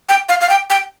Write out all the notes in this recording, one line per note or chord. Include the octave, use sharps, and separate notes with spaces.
G5
F5
F5
G5
G5